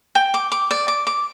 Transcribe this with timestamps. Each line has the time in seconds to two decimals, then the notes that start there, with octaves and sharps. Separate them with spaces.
0.15 G5
0.34 D6
0.52 D6
0.71 D5
0.88 D6
1.07 D6